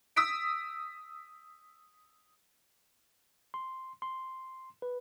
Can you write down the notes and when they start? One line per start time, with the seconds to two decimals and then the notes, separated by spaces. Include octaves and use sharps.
0.16 D#6 E6 B6 D7
3.54 C6
4.02 C6
4.82 B4